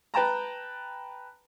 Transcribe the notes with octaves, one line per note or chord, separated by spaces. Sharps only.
B4 G5 A5 A#5